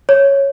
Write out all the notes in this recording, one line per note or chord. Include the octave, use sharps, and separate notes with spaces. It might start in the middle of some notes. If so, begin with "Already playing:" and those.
C#5